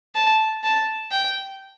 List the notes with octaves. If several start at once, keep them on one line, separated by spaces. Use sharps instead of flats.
A5
A5
G5